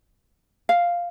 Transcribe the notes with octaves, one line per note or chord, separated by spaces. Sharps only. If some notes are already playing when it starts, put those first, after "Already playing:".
F5